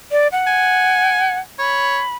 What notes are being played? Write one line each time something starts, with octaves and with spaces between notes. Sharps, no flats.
D5
F#5
G#5
C#5 B5